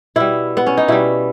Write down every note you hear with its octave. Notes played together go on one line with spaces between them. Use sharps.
B2 G3 E4
B3
C#4
D#4
B2 G3 E4